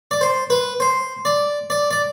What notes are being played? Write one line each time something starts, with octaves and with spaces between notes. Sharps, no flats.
D5
C5
B4
C5
D5
D5
D5